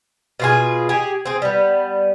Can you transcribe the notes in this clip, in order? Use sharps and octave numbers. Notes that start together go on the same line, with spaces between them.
B2 F4 G#4
G4 G#4
C4 G#4
G3 B3